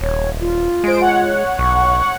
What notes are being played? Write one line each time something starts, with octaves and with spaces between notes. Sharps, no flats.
D#1 C#5
F4
G#3 C5 D7
C#5 F#5
B1 C#6